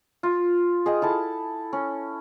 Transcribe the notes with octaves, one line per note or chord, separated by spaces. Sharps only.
F4
G#4 D#5 G5
E4 A4 A5
C#4